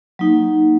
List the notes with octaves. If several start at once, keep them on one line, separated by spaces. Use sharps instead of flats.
F#3 A#3 D#4